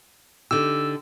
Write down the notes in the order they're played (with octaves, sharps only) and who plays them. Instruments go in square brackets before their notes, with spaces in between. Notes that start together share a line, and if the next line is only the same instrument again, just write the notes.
[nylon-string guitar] D3 D#4 G4 [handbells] E6